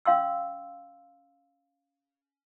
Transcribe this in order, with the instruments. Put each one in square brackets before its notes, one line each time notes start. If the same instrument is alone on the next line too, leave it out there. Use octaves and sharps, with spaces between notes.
[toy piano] C#4 F5 C6 E6